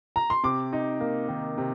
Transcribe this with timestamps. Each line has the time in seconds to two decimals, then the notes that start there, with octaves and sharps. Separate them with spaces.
0.16 A#5
0.30 C6
0.43 C3 D6
0.73 D#4
1.00 A#3
1.28 D#3
1.58 C3